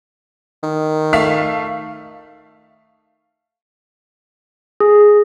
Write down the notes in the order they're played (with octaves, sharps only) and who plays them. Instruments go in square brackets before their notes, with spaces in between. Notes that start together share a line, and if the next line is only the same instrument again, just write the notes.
[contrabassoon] D#3
[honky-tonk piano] A3 F5 B6
[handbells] G#4